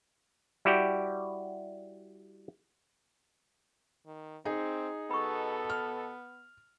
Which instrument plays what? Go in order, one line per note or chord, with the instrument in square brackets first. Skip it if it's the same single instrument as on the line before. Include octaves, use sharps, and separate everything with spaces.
[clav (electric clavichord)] G3 E4 F#4 G4 D5 G5
[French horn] D#3
[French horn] C4 [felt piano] D#4 G#4
[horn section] B2 A4 [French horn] B3 [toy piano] B5 C#6
[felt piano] F6